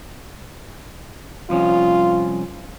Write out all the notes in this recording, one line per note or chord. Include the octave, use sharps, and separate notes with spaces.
C2 F3 C#4 F4